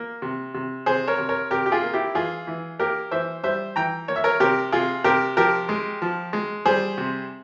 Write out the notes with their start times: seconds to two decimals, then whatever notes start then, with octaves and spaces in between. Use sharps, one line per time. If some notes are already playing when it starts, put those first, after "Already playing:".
Already playing: A#3
0.22 C3
0.54 C3
0.86 C3 G#4 C5
1.08 A#4 C#5
1.18 C3
1.29 A#4 C#5
1.51 C3 G4 A#4
1.66 G4
1.72 F4 G#4
1.83 A#3
1.94 E4 G4
2.15 E3 F4 G#4
2.47 E3
2.79 A#3 G4 A#4
3.11 E3 C5 E5
3.44 G3 C5 E5
3.76 E3 G5 A#5
4.08 A#3 C#5
4.16 E5
4.24 A#4 C#5
4.40 C3 G4 A#4
4.72 C3 F4 G#4
5.04 C3 G4 A#4
5.37 F3 G4 A#4
5.69 G#3
6.02 F3
6.33 G#3
6.65 G3 G#4 C5
6.98 C3